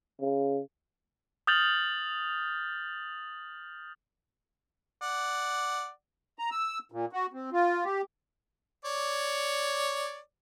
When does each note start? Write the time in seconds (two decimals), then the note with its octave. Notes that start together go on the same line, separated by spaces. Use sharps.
0.21 C#3
1.47 D#6 F6 G6 A6 F7 F#7
5.02 D5 F#5
6.39 A#5
6.51 E6
6.92 A#2
7.13 F#4
7.33 C4
7.53 F4
7.85 G4
8.85 C#5 D5